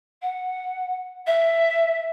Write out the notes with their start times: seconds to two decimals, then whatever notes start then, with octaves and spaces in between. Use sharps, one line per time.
0.22 F#5
1.26 E5